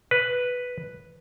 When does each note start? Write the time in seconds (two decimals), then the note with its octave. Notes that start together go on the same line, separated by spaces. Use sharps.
0.11 B4